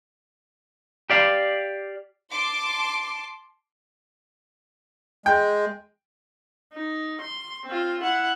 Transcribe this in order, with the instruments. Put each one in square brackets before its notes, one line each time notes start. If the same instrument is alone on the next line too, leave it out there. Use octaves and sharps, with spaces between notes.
[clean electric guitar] G4 D5 F5
[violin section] A5 C6 D6
[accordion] G#3 [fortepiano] G5
[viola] D#4
C6
C4 F4
E4 F#5